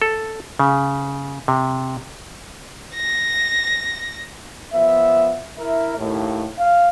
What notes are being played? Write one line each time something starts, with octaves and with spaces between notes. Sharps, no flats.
A4
C#3
C3
A#6
F3 B3 E5
E4 A#4 E5
D#2 A2
F5